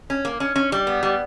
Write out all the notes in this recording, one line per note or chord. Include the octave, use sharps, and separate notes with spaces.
C#4
A#3
C#4
C#4
G3
B3
G3